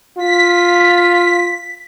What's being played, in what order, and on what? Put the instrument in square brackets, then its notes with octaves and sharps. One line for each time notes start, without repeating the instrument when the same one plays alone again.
[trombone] F4 [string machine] B6